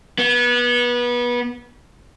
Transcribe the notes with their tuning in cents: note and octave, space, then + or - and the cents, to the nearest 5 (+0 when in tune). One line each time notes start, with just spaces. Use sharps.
B3 -25